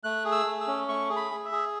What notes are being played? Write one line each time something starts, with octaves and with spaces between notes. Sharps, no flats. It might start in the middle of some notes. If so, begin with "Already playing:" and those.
A3 F#6
G#4
E6
A3
E6
C#4
A3 C#6
G#4
B5
G#4
E5
G#4